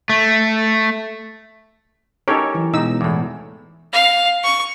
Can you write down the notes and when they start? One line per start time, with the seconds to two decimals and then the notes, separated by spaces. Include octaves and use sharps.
0.10 A3
2.28 C#4 D#4 G4 A4 A#4 C#5
2.55 E3 F#3
2.74 B2 G#3 D#4 E6
3.01 E2 A2
3.93 F5
4.43 C#6